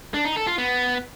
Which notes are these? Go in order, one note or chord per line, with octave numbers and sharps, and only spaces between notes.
D4
D#4
A4
F4
B3